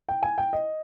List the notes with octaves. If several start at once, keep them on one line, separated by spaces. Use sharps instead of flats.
G5
G#5
G5
D#5